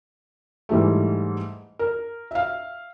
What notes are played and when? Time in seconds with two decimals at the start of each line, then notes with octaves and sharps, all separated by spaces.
0.69 G#2 E3 G3 A3
1.79 A#4
2.31 E5 F5